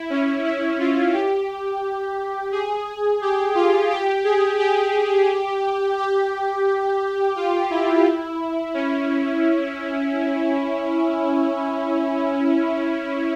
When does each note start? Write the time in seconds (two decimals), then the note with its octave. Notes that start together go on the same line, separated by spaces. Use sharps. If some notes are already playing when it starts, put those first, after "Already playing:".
Already playing: E4
0.10 C#4
0.44 E4
0.79 F4
1.13 G4
2.52 G#4
3.21 G4
3.55 F4
3.90 G4
4.24 G#4
4.59 G4
5.98 G4
7.36 F4
7.70 E4
8.74 C#4